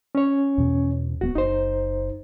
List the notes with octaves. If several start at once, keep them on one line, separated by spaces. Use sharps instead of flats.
C#4 C#5
E2 B2
D1 G#3 B3 F#4
F#1 D#4 C5